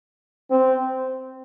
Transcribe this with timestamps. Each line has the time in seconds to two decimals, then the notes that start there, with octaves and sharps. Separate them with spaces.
0.51 C4